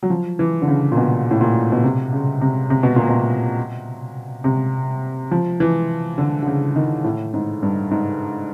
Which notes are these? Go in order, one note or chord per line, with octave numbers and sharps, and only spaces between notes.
F#3
F3
E3
D3
C#3
A#2
B2
A2
A#2
B2
C3
C#3
C3
C3
B2
A#2
B2
C3
F3
E3
D3
D3
C#3
D#3
A2
G#2
G2
G#2